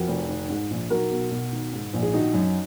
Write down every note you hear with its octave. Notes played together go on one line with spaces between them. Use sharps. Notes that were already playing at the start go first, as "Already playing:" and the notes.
Already playing: F2 F#4 A#4
F1
D#3
G#2
A#1
B1 F#4 A#4
B2
B2
D#3
G#2
A#1
G#4
D#3 D#4 F#4
F#2